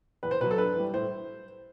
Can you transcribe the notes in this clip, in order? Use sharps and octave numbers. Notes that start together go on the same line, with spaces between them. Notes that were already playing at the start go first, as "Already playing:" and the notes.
E2 B4
C5
B2 F#3 B4
A4
G2 B4
E3 G3
A2 C5